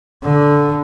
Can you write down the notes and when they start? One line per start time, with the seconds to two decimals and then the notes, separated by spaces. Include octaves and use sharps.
0.23 D3